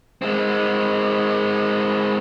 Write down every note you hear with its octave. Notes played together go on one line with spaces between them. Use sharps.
G#3 C4